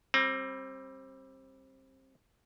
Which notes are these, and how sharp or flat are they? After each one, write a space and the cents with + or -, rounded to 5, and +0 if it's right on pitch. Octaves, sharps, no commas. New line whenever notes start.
G3 +0 C4 +25